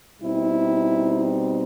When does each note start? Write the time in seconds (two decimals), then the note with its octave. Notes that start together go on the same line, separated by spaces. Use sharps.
0.21 B2 G3 C4 D#4 E4